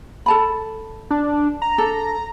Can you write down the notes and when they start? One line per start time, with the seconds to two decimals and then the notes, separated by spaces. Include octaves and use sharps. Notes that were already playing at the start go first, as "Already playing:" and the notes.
0.26 A4 A5 B5
1.10 D4
1.62 A#5
1.78 D4 A4